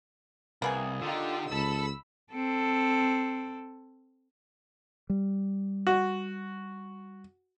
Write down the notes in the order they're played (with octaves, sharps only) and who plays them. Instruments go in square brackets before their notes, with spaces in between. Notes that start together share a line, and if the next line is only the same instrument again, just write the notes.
[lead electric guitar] C2 [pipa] A#3 B3 G#4
[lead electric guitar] D3 [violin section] D#4 F4 G4
[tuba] C#2 [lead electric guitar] A4 A5 [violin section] B5 E6
[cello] C4 A4
[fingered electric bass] G3
[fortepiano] F#4